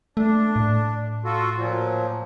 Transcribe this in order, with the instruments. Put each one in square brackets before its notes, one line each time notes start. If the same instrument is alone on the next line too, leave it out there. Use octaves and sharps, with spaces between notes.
[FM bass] A3 [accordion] D4
[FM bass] A2
[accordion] F4 F#4 A4
A#2 F3 F#3